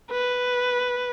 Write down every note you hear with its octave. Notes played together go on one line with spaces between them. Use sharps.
B4